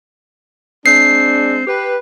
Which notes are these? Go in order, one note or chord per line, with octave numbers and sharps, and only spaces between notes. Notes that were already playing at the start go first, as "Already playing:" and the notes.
G#3 C4 D4 C7
G4 B4